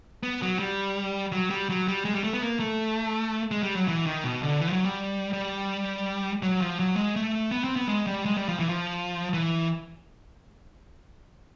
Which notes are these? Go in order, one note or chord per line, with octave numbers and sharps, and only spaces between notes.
B3
F#3
G3
F#3
G3
F#3
G3
G#3
G3
A3
B3
A#3
A3
G#3
G3
F#3
E3
D#3
B2
D3
E3
F3
F#3
G3
G3
F#3
F3
F#3
G#3
A3
B3
C4
B3
G#3
G3
G#3
G3
F3
E3
F3
E3